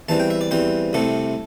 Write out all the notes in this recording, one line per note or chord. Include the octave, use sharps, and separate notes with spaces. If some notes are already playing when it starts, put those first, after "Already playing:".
E2 E3 G3 C4 A5
G5
E5
D5
E2 E3 G3 C4 C5
C2 C3 A3 C4 A4